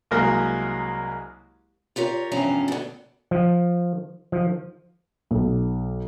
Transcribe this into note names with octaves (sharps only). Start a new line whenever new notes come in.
C2 F#3 G#3 A#3 A#4
F4 G4 A#4 C#5
E2 G2 C3 F3 C#4 A#5
B2 D3
F3
F3
B1